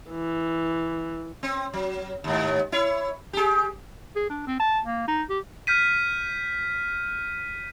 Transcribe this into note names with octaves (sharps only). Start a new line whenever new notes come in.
E3
C4
F#3
D#2 G#2
E4 C#5
G4 G#4
G#4
D4
C4
A5
A#3
D#4
G4
F6 G6 B6 D#7